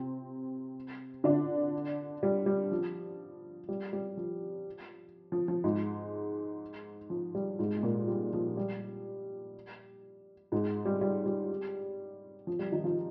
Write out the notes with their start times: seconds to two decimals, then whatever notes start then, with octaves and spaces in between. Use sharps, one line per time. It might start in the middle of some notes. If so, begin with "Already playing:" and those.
Already playing: C3 C4
1.24 D3 D4
2.23 G3
2.46 G3
2.72 F3
3.69 G3
3.93 G3
4.17 F3
5.32 F3
5.48 F3
5.64 G#2 G#3
7.10 F3
7.35 G3
7.59 G#2 G#3
7.77 G#3
7.83 A#2 A#3
8.08 G3
8.33 F3
8.57 G3
10.52 G#2 G#3
10.85 G3
11.01 G3
11.26 G3
12.47 F3
12.59 G3
12.72 D#3 D#4
12.84 F3 F4